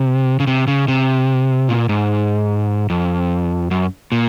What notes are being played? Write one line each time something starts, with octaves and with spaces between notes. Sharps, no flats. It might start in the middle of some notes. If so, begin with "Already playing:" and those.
Already playing: C3
C#3
C3
C#3
C3
A#2
G#2
F2
F#2
A#2